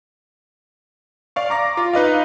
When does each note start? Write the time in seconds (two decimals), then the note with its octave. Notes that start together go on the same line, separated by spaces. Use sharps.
1.36 D5 F5 C#6
1.50 A#5 D6 A#6
1.77 F4
1.93 D#4 B4 D#5 F5